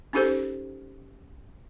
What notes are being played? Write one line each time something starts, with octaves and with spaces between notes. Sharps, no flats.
C#4 D#4 G4 A4 C5